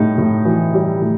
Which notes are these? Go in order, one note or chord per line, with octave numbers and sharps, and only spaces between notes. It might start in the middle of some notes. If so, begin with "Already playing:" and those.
Already playing: A2 G3 D#4
A2
E3
G3
A2